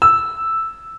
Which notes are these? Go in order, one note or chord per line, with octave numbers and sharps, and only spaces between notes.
E6